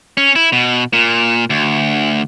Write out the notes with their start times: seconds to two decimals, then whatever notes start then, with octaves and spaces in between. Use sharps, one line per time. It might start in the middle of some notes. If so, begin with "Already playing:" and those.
0.17 C#4
0.36 E4
0.52 B2
0.93 A#2
1.50 D2